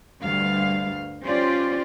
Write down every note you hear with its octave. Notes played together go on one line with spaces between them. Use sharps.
D2 G2 G3 F5
C#4 F4 G4 C5 D5